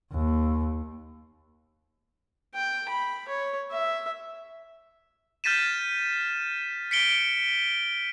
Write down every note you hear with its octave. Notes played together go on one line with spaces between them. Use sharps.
D#2
G5
B5
C#5
E5
F6 G6 A6 B6 D#7 E7
B6 C#7 D7 G7